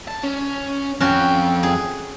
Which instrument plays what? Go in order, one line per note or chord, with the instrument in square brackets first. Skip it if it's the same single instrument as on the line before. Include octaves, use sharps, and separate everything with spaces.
[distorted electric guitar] A5
C#4
[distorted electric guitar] F2 G5 [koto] C#4 F#4
[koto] G#4